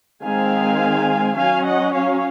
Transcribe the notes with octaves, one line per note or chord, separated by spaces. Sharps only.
D#3 G#3 C4 F5 G#5
F#3 C#4 F5 G#5
D#5 F#5
C#5 F5